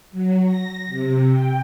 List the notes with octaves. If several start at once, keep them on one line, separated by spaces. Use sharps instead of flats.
F#3
A#6
C3
G5